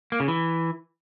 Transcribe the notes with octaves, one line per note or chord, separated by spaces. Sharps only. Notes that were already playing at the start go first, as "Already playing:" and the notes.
A#3
C#3
E3